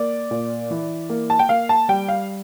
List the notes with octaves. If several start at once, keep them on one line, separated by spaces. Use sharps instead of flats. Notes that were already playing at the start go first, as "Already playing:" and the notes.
Already playing: A#3 D5
A#2
E3
A#3
A5
G5
A#3 F5
A5
G3 G5
F5